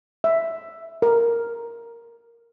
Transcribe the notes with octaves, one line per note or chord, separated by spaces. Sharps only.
E5
A#4